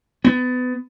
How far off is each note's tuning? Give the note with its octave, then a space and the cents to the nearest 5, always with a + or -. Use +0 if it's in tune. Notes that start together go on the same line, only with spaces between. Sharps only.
B3 +25